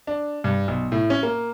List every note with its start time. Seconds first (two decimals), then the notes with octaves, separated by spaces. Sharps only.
0.07 D4
0.44 G2
0.68 B1
0.92 A2
1.10 C#4
1.23 A#3